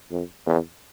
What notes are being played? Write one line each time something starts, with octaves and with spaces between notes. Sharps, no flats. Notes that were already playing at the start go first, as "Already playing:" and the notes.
F2
E2